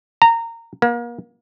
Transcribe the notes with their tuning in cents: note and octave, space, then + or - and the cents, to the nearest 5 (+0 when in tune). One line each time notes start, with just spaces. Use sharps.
A#5 -20
A#3 +35